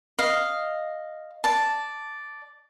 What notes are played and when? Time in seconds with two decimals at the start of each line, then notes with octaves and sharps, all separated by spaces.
0.19 D#5 F5
1.44 D5 A5